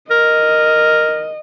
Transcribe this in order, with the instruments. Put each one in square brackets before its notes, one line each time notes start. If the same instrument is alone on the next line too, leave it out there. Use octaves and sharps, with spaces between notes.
[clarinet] A#4 [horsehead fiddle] D#5